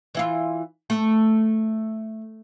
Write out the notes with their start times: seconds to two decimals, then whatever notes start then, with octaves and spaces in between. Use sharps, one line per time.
0.15 E3 E4 F4
0.90 A3